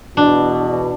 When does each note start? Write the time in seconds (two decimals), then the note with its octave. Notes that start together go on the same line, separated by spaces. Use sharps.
0.17 E2 B2 D4